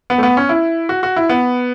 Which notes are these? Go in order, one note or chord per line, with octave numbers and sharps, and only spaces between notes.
B3
A3
B3
C#4
E4
F#4
F#4
E4
B3